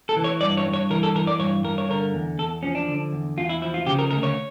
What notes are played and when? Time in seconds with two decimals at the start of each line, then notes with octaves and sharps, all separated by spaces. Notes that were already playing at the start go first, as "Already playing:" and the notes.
0.09 A4
0.17 E3
0.24 C#5
0.41 G2 D5
0.57 C#5
0.67 G2
0.74 C#5
0.90 E3 A#4
1.03 A4
1.15 E3 A#4
1.27 D5
1.39 G2 C#5
1.64 G2 A#4
1.78 C#5
1.89 D3 A#4
2.14 E2
2.39 E2 A4
2.63 F3 C#4
2.75 D4
2.88 D3
3.12 E2
3.37 E2 F4
3.49 E4
3.62 F3 E4
3.74 F4
3.86 C#3 G4
3.99 A#4
4.11 D2 A#4
4.23 C#5